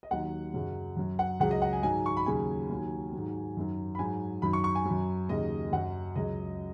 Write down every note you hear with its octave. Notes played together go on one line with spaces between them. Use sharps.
D#5
D#2 D#3 F#3 F#5
F#2 C#3 F#3
F#2 F#3
F#5
C#2 C#3 F#3 F#5
D#5
F#5
G#5
G#2 D#3 F#3 G#5
C#6
B5
D#2 C#3 F#3 G#5
D#2 D#3 F#3
G#2 D#3 F#3
F#2 D#3 F#3
B5
G#2 F#3 G#5
F#2 D#3 F#3 B5
C#6
C#6
G#5
F#3
F#2
D#2 C#3 F#3 D#5
F#2 F#3 F#5
C#2 C#3 F#3 D#5